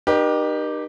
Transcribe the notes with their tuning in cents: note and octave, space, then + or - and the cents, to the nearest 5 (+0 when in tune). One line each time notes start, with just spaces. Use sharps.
D#4 -35 G4 +0 A#4 +40